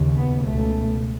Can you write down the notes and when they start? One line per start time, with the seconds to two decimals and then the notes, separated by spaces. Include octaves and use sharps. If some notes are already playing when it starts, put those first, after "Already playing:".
Already playing: D#2 C#3
0.16 B3
0.45 C#2 B2 A3